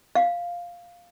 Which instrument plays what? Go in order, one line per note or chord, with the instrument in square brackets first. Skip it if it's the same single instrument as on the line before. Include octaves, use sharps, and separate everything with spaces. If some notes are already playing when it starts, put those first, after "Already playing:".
[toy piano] F5